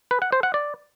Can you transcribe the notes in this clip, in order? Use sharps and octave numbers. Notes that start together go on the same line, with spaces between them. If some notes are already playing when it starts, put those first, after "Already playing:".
B4
F#5
C5
F#5
D5